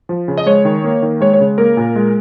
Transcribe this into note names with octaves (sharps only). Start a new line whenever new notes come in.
F3
C#3
D#5
G#3 C#5
D#3
A#3
D#3
G#3 C#5
C#5
C#3
A#3 A#4
A#2
G#3